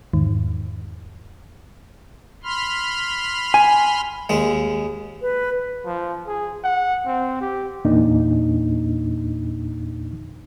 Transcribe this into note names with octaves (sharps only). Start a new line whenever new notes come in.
E2 G#2 D#3
B5 C6 F6
G#5
D#2 G#3
B4
F3
G#4
F#5
C4
G4
E2 A#2 A#3 D4 D#4